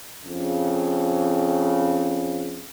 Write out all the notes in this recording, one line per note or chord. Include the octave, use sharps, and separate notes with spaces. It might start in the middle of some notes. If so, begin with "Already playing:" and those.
F2 C#3